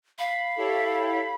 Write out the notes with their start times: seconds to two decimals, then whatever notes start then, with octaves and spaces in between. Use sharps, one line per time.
0.19 F5 B5
0.57 E4 G4 A4 C#5